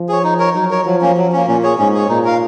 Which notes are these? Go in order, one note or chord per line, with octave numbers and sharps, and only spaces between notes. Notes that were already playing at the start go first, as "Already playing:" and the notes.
Already playing: F3
G#4 C#5
D#4
A#4 C#5
F#3 D#4
A#4 C#5
F3 F#3
A#3 C#4
F#3
A#3 C#4
A#2 C#4
G#4 C#5
G#2 C#4
G#4 C#5
A#2 D#4
A#4 F5